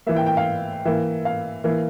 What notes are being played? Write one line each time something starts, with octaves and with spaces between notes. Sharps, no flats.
E3 A#3 E5
G5
G5
F5
E3 A#3 E5
F5
E3 A#3